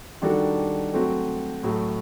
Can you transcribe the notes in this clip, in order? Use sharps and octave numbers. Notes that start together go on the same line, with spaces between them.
D#3 G3 D4 F#4 A4
F#3 A3 C4 F#4
A2 F#3 A3